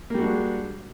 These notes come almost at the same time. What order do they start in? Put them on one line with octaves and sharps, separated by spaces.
A#3 G3 F#4 D4 G#3